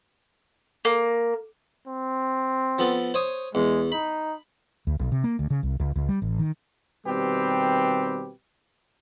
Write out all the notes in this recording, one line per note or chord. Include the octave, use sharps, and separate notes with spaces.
A#3
C4
F3 B3 A4
C5 C#5 D#6
E2 G#3
D#4 B5
D2
B1
C3
A#3
D2
C#3
C2
C#2
C#2
G3
A1
D#3
B2 D#3 G3 C4 G4 B4